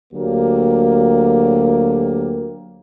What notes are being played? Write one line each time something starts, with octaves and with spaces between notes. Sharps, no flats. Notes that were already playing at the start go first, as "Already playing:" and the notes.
D2 F#3 A#3 G4